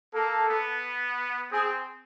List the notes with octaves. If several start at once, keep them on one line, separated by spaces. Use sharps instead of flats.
A#3 A4
B3
C4 G#4